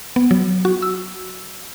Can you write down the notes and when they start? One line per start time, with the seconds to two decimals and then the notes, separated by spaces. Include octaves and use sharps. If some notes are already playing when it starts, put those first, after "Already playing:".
0.16 B3
0.31 F#3
0.65 F#4
0.82 E6